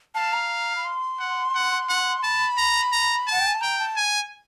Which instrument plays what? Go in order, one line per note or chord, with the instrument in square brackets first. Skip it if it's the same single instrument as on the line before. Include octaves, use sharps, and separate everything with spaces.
[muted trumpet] F5 [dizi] A5
[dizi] A#5
B5
C6
[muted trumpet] F#5
F#5
F#5
[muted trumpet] A5 [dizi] B5
[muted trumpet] A#5
A#5
[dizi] F#5 [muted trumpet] A5
[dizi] G5
G#5
A5
[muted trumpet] G5 [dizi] A#5
[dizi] A5
[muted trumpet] G#5